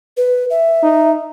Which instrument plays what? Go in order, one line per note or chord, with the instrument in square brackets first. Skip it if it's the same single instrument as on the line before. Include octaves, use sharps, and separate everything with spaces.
[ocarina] B4
E5
[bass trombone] D#4